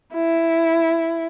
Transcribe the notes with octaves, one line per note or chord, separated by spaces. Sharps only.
E4